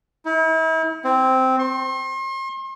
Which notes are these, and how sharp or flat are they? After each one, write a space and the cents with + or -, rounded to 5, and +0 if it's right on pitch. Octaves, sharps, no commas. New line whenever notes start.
E4 -40
C4 -5
C6 +40